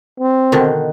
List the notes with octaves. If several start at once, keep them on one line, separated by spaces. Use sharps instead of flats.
C4
B2 D3 D#3